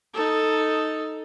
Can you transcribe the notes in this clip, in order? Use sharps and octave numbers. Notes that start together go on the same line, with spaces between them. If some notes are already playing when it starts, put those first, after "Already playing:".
D#4 A4